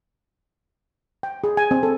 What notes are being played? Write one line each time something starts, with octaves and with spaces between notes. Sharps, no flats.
G5
G#4
G#5
C4
A4